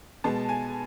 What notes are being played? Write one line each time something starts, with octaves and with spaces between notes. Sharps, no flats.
B2 G#3 B3 A5
G#5